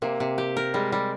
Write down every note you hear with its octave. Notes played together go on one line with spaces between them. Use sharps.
C3 A#3
C3
G4
A#4
G3 G#3
G3